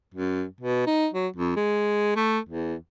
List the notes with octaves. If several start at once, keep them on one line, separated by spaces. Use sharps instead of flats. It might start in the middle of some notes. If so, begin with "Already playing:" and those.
F#2
B2
D#4
F#3
F2
G#3
A3
E2